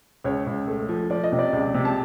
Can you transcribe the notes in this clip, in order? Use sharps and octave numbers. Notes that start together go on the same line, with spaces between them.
C#2 C#5
C#2
A3
F3
F3 D5
D#5
C3
D5
C#2
C3
A5